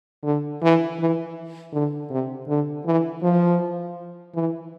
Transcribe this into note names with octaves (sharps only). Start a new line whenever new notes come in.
D3
E3
E3
D3
C3
D3
E3
F3
E3